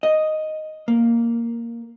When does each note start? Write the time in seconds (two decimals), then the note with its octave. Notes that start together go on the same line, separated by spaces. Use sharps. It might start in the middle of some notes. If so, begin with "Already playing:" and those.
0.03 D#5
0.88 A#3